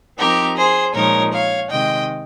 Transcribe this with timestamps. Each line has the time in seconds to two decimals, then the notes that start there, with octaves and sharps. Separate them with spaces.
0.18 F3 C4 D#4 G4 A#4
0.56 G#4 C5
0.94 A#2 F3 G#3 D#4 A#4 C#5
1.33 C#5 F5
1.71 C3 D#3 G#3 D#5 G5